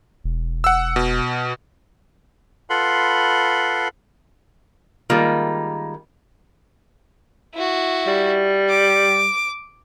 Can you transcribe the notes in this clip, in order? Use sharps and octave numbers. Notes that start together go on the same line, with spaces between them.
E1
F#5 E6
B2
F4 A4 B4 F#5 B5 C6
D#3 G3 G#3 A#3 F4
E4 F#4
G3
D6